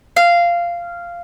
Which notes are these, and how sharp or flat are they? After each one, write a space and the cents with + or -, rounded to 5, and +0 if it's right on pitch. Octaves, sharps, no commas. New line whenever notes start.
F5 -10